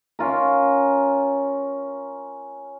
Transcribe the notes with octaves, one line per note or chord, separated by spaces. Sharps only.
C#4 F4 A#4